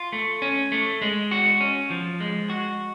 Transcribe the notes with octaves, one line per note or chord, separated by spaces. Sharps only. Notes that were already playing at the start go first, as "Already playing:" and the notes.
Already playing: F4
A3
C#4
A3
G#3
F#4
C#4
F3
G#3
F#4